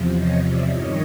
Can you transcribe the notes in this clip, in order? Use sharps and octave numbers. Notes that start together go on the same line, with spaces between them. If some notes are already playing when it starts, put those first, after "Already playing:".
Already playing: E2 C3 F3
C#5 D#5
D5 E5
G2 D#3 C#5 D#5